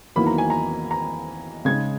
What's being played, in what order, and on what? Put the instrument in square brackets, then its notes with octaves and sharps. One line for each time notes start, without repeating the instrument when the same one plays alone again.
[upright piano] E2 D#3 F#3 A#3 E4 B5
A#5
G#5
A#5
A#5
C#3 G#3 D#4 G#6